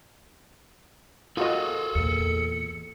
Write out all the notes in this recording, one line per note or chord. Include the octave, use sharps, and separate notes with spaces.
F4 F#4 G#4 A4 D#5
E2 A#2 C#7